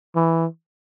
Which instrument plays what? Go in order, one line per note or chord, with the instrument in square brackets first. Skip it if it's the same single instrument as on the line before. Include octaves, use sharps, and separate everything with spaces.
[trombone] E3